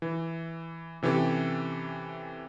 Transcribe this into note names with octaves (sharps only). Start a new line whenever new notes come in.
E3
C3 E3 C#4 G4 A4